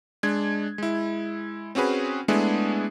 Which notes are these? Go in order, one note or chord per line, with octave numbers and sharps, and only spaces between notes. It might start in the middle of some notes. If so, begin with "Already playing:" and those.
G#3 D4 G#6
G#3 E4
C4 C#4 F#4 G#4 B4
G#3 A3 B3 D4 E4 G#4